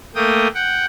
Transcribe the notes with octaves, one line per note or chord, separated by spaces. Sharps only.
A3 A#3 G5 D#6
F#5 G5